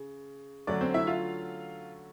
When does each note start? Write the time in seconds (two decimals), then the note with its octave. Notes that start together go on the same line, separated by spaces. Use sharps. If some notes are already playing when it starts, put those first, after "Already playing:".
Already playing: C#3
0.67 D3 F#3 A3 C#4 D4 D5
0.81 C4 C5
0.94 E4 E5
1.07 F4 F5